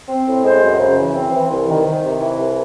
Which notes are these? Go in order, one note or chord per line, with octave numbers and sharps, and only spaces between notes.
C4
A2
G#3 C5
F#2
C#3
E3
C4
E3
C2
D#3
D#3
C3
E3
C2